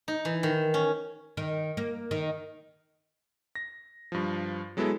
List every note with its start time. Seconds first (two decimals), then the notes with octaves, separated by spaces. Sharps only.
0.08 D#4
0.25 E3
0.43 D#3
0.74 C#4
1.37 D#3
1.77 A#3
2.11 D#3
3.55 A#6
4.12 G2 F3
4.77 F#3 G#3 B3 E4 A4